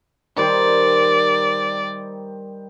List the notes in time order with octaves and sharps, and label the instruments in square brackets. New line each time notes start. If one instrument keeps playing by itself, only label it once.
[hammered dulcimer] D#3 G3 C5 [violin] D5